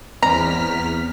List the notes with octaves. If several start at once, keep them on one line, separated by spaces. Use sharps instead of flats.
E2 C4 D5 A#5 F6 B6